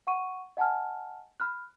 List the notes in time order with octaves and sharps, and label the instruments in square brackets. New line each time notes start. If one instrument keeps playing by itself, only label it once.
[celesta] F#5 C#6 D#7
D#5 F#5 G#5 A5 F6
B5 F6 F#6